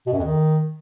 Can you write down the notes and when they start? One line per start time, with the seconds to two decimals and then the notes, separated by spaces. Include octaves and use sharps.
0.07 B2
0.12 F#2
0.18 F2
0.24 D#3